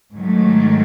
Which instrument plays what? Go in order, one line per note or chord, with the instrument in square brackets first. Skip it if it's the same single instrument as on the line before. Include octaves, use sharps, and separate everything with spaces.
[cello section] G#2 D#3 F#3 A3